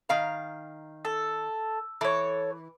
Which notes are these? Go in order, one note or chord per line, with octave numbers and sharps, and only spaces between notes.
D#3 F5 A#5
A4
E3 A4 C#5